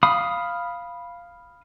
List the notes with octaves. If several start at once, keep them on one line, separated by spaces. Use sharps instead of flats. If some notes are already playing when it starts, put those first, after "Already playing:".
F5 B5 D#6